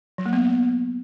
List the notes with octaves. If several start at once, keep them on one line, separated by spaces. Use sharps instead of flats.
F#3
A#3
B3